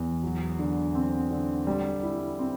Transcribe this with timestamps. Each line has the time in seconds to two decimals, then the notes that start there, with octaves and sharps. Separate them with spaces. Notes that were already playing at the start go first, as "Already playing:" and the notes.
Already playing: E2
0.23 F#3
0.59 D3
0.95 C4
1.31 D3
1.67 G3
2.03 E4
2.39 C4